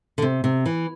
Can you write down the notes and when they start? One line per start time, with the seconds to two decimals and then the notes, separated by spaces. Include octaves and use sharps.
0.18 D3
0.22 C3
0.44 C3
0.66 E3